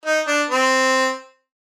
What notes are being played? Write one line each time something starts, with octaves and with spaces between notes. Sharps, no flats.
D#4
D4
C4